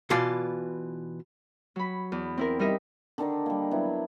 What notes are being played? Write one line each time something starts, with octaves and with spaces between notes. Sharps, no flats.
B2 E3 F4 D5 C6
F#3 B5
E2
C4 E4 A#4
G3 D#4 A#4 D#5 E5
D3 D#3 D4 D#4
G3 A#3
F#3 B3 E4